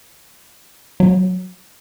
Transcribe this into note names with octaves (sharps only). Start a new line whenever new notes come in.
F#3